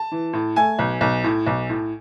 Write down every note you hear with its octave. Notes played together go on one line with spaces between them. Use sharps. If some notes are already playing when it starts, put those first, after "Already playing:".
Already playing: A5
E3
A2
A3 G#5
B1
B1
A2
B1
A2